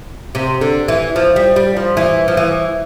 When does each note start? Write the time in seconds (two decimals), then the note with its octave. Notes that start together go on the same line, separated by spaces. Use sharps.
0.35 C3
0.61 D3
0.88 E3
1.16 F3
1.36 G3
1.56 G3
1.77 F3
1.97 E3
2.28 F3
2.37 E3